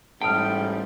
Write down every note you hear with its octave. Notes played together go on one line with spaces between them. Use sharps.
A1 G#2 G3 G5 A5 B5 D#6 F6